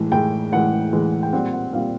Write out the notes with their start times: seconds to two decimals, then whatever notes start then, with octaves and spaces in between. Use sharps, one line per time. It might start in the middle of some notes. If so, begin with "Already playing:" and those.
Already playing: A2 E3 G#3
0.12 A2 E3 G#3 G5
0.52 A2 E3 G#3 F#5
0.93 A2 E3 G#3
1.23 G5
1.33 A#2 G3 C4 F#5
1.53 F#5
1.73 A#2 G3 C4 F5